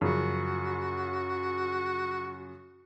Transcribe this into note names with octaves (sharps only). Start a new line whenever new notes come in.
F#2 C#3 F3 F#4